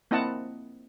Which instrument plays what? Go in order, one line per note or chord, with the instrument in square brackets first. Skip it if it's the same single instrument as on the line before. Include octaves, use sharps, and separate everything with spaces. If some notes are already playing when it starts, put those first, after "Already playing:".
[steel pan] A#3 C4 E4 D#5 F#5 A5